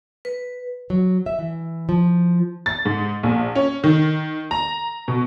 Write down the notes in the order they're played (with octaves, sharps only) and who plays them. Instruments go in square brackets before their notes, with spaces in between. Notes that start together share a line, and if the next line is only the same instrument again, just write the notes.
[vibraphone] B4
[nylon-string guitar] F#3
E5
E3
F3
[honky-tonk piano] A6
G#2
A#1
C#4
D#3
A#5
B2